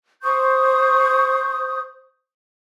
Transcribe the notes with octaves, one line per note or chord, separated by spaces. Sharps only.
C5 C#6 D#6 G6